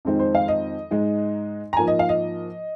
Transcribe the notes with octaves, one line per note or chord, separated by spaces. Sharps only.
F2 D#3 G#3 C4 D#4
C5
F5
D#5
G#2 G#3 D#4
A#5
G#2 F3 A#3 G#5
D#5
F5
D#5